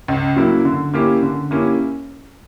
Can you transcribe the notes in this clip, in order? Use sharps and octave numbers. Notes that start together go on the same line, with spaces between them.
C#2
C#3 F#3 A#3 E4
D3
A#3 C#4 E4 G4
D3
A#3 C#4 E4 G4